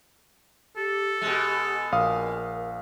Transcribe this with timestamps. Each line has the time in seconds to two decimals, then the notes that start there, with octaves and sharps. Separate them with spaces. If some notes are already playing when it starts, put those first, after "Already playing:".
0.77 G4 A4
1.22 B2 G#3
1.92 A#1 A#4 F5 D#6